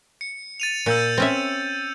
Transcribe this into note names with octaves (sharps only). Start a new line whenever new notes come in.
C#7
A6 D#7 F7
A#2 E6 G6 C#7
C4 C#4 E5